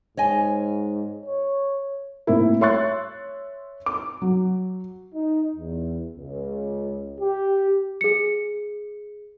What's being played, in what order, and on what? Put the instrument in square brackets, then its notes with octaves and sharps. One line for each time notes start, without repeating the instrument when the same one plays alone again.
[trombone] G#2 [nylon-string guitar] C#5 D#5 G#5
[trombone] C#5
[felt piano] A2 A#3 C4 E4
C#5 E5 C6 C#6 F#6 A6
D6
F#3
[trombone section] D#4
E2
C#2
G4
[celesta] G#4 C#7